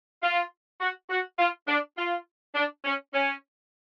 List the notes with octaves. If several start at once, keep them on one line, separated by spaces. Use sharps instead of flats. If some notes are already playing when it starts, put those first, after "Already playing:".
F4
F#4
F#4
F4
D4
F4
D4
C#4
C#4